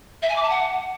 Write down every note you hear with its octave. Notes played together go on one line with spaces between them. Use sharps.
E5
G#5
D6
A5
F#5